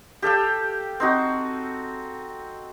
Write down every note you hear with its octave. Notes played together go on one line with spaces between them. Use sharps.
G4 A4 F5 G5
C4 D#4 F#4